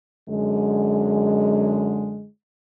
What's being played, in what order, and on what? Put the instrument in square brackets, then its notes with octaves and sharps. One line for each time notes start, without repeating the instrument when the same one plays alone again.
[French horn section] F#2 D3 G#3